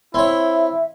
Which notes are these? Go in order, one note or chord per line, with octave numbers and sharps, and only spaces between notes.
C4 E4 C#5 E5